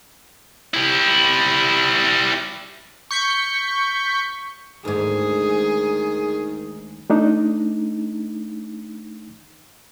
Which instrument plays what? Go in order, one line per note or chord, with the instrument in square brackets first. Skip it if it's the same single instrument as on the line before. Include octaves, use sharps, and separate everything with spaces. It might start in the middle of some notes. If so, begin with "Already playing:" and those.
[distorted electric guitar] G3 E4
[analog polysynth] C#6 G6 B6 C#7
[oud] D2 G#2 [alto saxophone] D#3 [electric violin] G#4
[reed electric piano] A3 D4 D#4